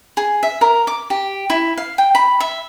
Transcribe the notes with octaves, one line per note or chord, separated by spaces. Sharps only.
G#4
E5
A#4
D6
G4
E4
F5
G5
B5
E5